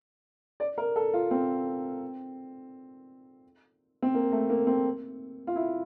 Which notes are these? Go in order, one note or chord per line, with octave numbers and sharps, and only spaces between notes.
D5
A#4
A4
F4
C4
C4
A#3
A3
A#3
C4
F4
E4